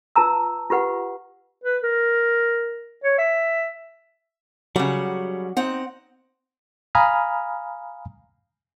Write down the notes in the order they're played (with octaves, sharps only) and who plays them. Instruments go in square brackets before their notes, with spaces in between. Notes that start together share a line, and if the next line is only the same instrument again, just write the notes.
[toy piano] F4 B4 A5 A#5 E6
F4 G4 B4 F#5
[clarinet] B4
A#4
C#5
E5
[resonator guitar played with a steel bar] C#3 G3 [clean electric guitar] F#3 [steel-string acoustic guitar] F#5
[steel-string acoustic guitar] C4 F#5 [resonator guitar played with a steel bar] D#4
[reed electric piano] F5 G#5 A#5 B5 D#6 F6